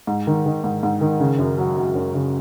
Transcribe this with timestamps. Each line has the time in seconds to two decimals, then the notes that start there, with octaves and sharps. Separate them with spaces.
0.07 G#2
0.27 D#3
0.46 D#3
0.64 G#2
0.83 G#2
1.01 D#3
1.20 C#3
1.39 F#2
1.58 F#3
1.77 F#3
1.95 F#2
2.14 C#3